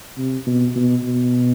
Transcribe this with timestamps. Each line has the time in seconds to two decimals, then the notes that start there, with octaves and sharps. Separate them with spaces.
0.18 C3
0.47 B2
0.75 B2
1.03 B2